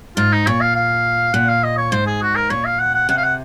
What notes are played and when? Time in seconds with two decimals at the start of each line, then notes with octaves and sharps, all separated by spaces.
0.17 G#2 F4
0.32 D#4
0.47 A#2 C#5
0.61 F5
0.76 F5
1.34 A#2 F#5
1.49 F5
1.63 D#5
1.78 C#5
1.92 G#2 C5
2.06 G#4
2.22 F#4
2.36 A#4
2.50 A#2 C#5
2.65 F5
2.80 F#5
2.94 F#5
3.09 C3 F#5
3.17 F5
3.24 F#5